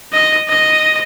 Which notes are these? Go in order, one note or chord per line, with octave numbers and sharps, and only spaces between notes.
D#5
D#5